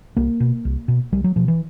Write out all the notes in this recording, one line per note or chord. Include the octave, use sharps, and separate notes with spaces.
C2 A#3
B2
C2
B2
C2 G3
F#3
B2 F3
E3